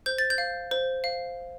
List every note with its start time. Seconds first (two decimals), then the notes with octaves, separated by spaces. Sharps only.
0.06 C5 G6
0.18 A6
0.30 G6
0.38 F5
0.71 C5
1.04 F5